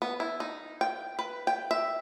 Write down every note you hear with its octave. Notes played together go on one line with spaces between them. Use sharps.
B3
E4
D#4
G5
B4
G5
E5